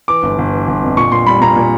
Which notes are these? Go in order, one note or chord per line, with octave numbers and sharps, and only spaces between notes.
E3 D6
G1
G1
E3
G1
F2
A#2 C#6
A#2 C6
G3 B5
A#2 A#5
A#2